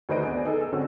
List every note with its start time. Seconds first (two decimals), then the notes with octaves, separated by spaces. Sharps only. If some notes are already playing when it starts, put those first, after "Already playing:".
0.09 D2 D#3 B4 C5 D#5 D7
0.24 B3 D4 G#4
0.45 D#4 G#4 A4
0.61 E6
0.72 G#2 D3 C4 C#4 F#4